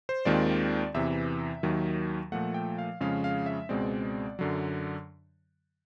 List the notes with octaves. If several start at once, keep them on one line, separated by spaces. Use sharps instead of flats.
C5
D#2 D#3 G#3 C4 F4 D5
E2 C3 E3 E5
D#2 D#3 F#3
A#2 F3 A3 F#5
G5
F5
F2 C#3 F3 G#3 C#4 F5
F5
E5
C#2 B2 G#3 C4 D5
F#2 D3 F#3